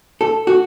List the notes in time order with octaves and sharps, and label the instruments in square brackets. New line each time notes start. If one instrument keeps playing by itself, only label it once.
[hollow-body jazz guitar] A4
F#4